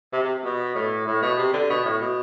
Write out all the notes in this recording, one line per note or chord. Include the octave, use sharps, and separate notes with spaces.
C3
C3
B2
A2
A2
B2
C3
D3
B2
A2
B2